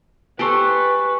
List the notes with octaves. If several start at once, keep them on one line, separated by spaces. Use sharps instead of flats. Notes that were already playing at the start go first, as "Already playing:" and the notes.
G4 A4 B4 C5 G#5 C#6